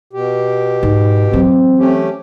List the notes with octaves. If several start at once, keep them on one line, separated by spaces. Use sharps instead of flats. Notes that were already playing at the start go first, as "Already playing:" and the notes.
B2 G4
G#2
E3 F#3 C4
A3 C#4 G4